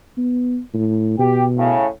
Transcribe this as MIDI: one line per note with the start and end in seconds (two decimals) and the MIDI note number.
0.18 0.59 59
0.74 1.15 45
1.19 1.76 47
1.19 1.42 67
1.57 1.86 45
1.57 1.86 49